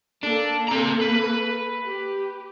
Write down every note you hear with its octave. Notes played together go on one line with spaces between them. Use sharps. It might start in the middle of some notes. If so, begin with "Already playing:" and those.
A#3 D4 A4
C4 A#5
B4
G4